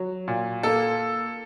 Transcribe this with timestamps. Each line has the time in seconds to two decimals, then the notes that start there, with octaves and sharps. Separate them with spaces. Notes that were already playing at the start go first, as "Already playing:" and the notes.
Already playing: F#3
0.28 A#2
0.63 A#3 A4